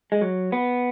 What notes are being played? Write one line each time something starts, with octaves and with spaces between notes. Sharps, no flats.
G#3
F#3
B3